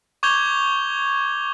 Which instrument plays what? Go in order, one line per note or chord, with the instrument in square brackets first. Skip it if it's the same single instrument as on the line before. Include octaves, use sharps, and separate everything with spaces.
[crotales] C#6 D6 G6 G#6 F7 G7